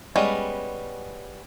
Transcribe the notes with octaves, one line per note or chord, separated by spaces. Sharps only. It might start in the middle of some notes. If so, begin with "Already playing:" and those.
G3 G#3 B3 C#4